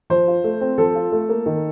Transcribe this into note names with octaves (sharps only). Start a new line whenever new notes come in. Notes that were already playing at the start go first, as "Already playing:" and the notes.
F3 C5
F4
A3
C4
F3 A4
F4
A3
A#3
D#3